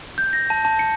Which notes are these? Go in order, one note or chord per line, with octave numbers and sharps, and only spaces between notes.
G6
A#6
A5
A5
C#7